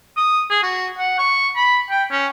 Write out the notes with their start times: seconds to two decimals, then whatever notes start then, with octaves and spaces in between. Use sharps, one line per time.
0.17 D#6
0.50 G#4
0.63 F#4
0.98 F#5
1.18 C#6
1.56 B5
1.90 G5
2.11 C#4